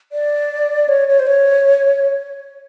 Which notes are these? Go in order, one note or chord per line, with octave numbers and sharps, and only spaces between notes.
D5
C#5
C#5
C5
C#5